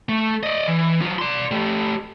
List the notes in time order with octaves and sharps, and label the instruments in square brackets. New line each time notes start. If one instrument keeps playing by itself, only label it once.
[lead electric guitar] A3
D5 D#5
E3
F#3 F4
D5 C6
A3 G4